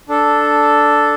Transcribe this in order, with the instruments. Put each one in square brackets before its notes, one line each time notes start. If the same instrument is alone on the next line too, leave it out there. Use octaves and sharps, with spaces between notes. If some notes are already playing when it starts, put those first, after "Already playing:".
[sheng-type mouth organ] D4 A4